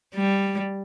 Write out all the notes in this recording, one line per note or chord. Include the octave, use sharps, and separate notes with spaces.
G3